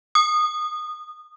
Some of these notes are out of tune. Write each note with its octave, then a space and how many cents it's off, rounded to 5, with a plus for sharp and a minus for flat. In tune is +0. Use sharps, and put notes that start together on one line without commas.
D#6 -20